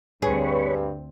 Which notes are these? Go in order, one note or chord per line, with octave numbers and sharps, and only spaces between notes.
D2 G2 C4 G#4 B4 C#5